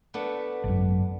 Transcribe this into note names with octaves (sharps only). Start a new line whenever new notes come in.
A3 B3 D4
G#1 F#2